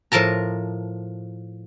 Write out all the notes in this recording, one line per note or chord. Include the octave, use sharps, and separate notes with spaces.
A2 F3 A#4 A5 A#5